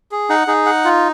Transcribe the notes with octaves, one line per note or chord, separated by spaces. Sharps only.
G#4
D#4 F#5
D#4 G#4
F#5
F4